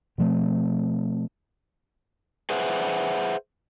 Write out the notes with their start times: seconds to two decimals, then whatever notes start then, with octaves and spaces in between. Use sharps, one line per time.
0.18 B2 F3 A3 C4
2.50 G#4 B4 C5 E5 F#5